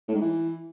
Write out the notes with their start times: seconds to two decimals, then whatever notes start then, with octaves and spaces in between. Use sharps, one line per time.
0.08 A2
0.15 G#2
0.21 E3